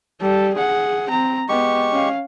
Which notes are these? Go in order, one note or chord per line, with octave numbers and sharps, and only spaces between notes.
G3 A4
G#4 F#5
C4 A#5
G#3 B3 G4 C#6
C#4 F5